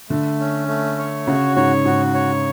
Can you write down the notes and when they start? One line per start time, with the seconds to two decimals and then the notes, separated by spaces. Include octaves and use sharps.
0.10 D3 A3
0.40 C#4
0.68 A3
0.98 C#5
1.27 C#3 F#4
1.56 G#2 C#5
1.85 G#2 F#4
2.14 C#5